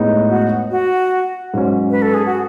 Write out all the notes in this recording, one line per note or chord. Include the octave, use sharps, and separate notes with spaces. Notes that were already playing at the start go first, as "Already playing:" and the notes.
Already playing: A2 G#3 B3 D#4
F#4
F#4
G#2 F#3 C#4
B4
A4
G#4
F#4